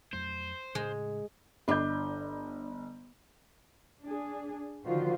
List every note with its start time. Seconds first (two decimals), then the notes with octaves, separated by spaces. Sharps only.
0.13 F2 F#3 A3 C5
0.75 A2 C#3 G#3
1.68 G1 D4 B4 D#5 G6
4.04 D4 G#4
4.85 D3 D#3 F3 F4 F#4 C5